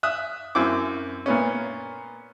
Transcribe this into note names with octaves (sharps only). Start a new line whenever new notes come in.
E5 D#6 F#6
F#2 C4 E4 D6
A#2 B3 C#4